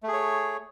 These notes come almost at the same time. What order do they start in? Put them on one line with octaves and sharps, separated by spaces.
A3 G#4 C#5